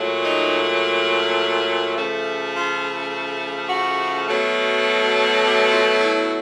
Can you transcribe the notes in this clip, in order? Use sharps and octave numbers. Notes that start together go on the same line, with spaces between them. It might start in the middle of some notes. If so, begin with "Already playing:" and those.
Already playing: A#2 F#3 A3
D#4
C#3 F3 A3
F4
F#4
B2 F#3 A3
G4
F4
E4